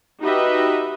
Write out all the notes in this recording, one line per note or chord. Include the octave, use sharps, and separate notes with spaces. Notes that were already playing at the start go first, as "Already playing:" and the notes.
D#4 F#4 G4 B4 D#5 E5